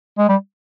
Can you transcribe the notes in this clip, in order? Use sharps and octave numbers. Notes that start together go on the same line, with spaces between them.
G#3
G3